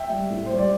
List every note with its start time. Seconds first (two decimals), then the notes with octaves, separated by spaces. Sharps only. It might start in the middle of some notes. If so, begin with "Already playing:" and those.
Already playing: E5 G5
0.10 G3
0.30 A2
0.46 G3 C5
0.59 D5